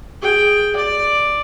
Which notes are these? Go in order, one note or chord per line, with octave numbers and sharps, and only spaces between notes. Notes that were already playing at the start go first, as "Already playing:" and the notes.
G#4 G5
D5